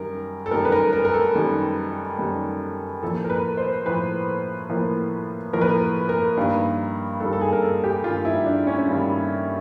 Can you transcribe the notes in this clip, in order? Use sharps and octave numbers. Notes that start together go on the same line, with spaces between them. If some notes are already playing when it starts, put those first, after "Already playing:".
Already playing: F#2 D#3 G3 A#4
A4
F#2 D#3 G3 A#4
B4
A#4
A#4
A#4
A4
F#2 D#3 G3
F#2 D#3 G3
A2 F3 A#3 A4
A#4
B4
C5
A2 F3 A#3 B4
A2 F3 A#3
A2 F3 A#3 A#4
B4
A#4
A#4
G2 D#3 G3 A#3
G2 D#3 G3 A#3 A4
A4
G#4
A#4
A4
G4
G2 D#3 G3 A#3 F4
E4
D4
C#4
G2 D#3 G3 A#3